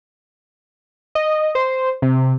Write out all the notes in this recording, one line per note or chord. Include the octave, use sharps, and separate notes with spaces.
D#5
C5
C3